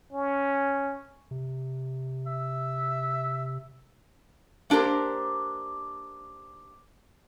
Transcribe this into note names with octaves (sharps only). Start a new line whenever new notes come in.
C#4
C3
E5
A#3 D4 G4 A#4 C5